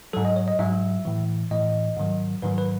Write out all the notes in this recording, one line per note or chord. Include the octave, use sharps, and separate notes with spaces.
G#2 F#3 A4
D#5
C#5
D#5
G#2 F#3 E5
A2 E3
A2 E3 D#5
G#2 D#3 F#3
G#2 D#3 F#3 B4
B4